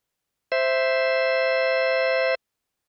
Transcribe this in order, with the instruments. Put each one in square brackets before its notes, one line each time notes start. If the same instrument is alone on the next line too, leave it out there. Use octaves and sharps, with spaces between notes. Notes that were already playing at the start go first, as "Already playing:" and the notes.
[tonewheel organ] C5 E5